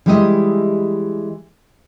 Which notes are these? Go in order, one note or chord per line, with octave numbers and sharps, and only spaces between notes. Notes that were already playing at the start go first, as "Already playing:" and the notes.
E3 G3 G#3 G4 A#4 D#5